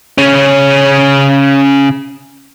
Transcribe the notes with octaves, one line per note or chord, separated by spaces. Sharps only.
C#3 C#4